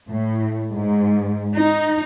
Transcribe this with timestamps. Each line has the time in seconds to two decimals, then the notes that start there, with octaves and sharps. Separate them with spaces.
0.11 A2
0.71 G#2
1.55 D#4